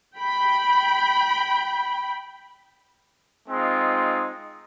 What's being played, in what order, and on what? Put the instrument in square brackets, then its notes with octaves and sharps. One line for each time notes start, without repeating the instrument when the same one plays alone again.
[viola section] G5 B5
[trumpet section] G#3 C4 D#4 F4